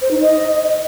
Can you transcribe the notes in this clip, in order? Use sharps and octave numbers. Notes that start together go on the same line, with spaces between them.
C5
D#4
D#5